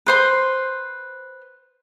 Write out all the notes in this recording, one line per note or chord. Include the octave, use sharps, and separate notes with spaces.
B4 C5 C6